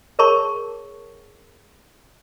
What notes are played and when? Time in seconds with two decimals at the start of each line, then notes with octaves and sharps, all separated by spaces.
0.19 G#4 A#4 C#5 A5 B5 C#6